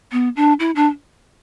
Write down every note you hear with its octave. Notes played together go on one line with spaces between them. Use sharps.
B3
D4
E4
D4